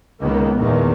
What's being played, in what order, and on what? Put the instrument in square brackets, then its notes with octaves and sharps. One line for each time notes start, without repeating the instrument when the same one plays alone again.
[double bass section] C#2 D#3 A#3 B3
E2 A#2 D#3